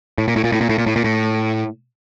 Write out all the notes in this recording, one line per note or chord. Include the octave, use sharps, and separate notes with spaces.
A2
A#2
A2
A#2
A2
A#2
A2
A#2
A2
A#2
A2